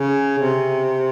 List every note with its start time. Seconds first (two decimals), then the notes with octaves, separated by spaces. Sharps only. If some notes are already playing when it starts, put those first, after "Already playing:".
Already playing: C#3
0.39 C3